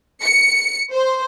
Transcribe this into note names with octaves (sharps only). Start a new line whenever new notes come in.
C#7
C5